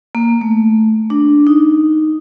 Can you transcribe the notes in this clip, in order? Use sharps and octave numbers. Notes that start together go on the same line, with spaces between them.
A#3
A3
D4
D#4